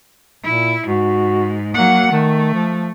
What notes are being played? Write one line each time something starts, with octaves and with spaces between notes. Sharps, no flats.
A#2 E4
G#2 F#4
F#3 A#3 F#5
D#3 A3
F3